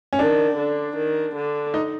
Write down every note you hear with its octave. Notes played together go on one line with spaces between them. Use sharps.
C#4
D#3 D4
D3
D#3
D3
D#4